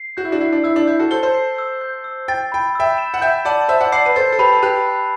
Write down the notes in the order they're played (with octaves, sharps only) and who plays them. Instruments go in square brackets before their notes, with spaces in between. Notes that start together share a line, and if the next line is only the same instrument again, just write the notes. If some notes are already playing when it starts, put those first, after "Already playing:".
Already playing: [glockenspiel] C7
[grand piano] F#4 [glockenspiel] G6
[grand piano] E4
D4 F#4
[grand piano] E4 [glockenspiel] C7
[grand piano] D4
[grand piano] E4 [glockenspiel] E6
[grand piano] D4
[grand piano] E4 [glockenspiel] G6
[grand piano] F#4 A4
[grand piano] A4 C5 [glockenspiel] G7
[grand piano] A4 C5
[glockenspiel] C7
E6
G6
E6
[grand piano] G5 [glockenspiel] A6
[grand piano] G5 [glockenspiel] B5
[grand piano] E5 G5 [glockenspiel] E6
[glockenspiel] E7
[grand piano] F#5
[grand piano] E5 G5 [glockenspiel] G6
[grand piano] D5 F#5 [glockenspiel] A5
[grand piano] C5 E5 [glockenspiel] E6
[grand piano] D5 F#5
[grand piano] D5 F#5 [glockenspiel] C7
[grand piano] B4
[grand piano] A4 C5 [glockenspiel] A6
[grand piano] A4
[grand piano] G4 B4 [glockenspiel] B5
[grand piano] A4
[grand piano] G4 B4 [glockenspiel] F#6
[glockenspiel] B5